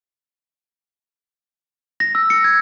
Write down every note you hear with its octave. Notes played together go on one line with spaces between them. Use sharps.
A#6
E6
C#7
G#6